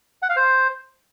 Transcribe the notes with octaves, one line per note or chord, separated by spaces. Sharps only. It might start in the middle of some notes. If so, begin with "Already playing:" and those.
F#5
F5
C5